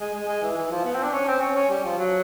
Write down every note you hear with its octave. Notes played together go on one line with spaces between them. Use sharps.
G#3
G#3
G#3
E3
E3
F3
B3
C4
D4
C#4
C4
C#4
C#4
G3
F3
F#3